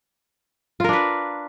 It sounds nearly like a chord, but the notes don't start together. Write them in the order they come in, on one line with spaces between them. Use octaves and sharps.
F4 A#4 D4 B4